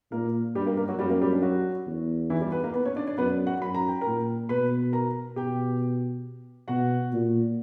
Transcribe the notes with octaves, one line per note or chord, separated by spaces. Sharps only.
A#2 A#3 A#4
G2 G3 G4
A#3 A#4
A#3 A#4
F#3 F#4
F#2 G3 G4
A#3 A#4
G3 G4
D4
F#3 F#4
E2
E3 E4
G3 G4
B3 B4
A#3 A#4
B3 B4
C#4 C#5
D4 D5
D4 D5
F#2 B3 B4
F#4 F#5
F#2 B5
A#5
G5
A#2 A#4 A#5
B2 B4 B5
A#4 A#5
B2 G4 G5
B2 F#4 F#5
A#2